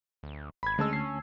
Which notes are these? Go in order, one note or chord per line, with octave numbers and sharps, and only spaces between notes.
D2
G#1 B5 G#6
D2 G#3 C#4 A5 E6
C7